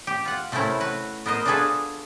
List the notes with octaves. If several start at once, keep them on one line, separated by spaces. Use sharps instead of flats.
G4
F4 F#5
C3 A3 C4 C#4 E4 A#4
F#4 B4
B3 A#4 C5 D#5
D4 F4 F#4 G#4 A4 B4